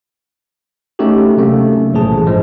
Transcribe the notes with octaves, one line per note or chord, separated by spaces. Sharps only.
A3 C#4 D#4 F#4 G4 A4
C3 F#3 A3 A#3 C#4
B1 A2 E3 F3 G#4 A5
G2 F3 G#3